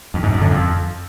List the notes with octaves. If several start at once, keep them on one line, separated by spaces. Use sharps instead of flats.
F2
G#2
F#2
D3
F2